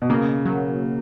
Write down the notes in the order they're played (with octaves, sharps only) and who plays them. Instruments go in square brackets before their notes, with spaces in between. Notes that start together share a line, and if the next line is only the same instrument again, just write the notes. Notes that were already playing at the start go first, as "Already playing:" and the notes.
[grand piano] B2
[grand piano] C#3 [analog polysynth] A#3
[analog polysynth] F#3